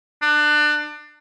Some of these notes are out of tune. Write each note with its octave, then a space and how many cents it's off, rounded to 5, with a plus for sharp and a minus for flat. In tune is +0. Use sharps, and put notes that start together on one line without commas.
D4 +25